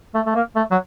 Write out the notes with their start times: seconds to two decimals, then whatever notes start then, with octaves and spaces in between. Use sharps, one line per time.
0.15 A3
0.26 A3
0.35 A#3
0.56 A3
0.71 F#3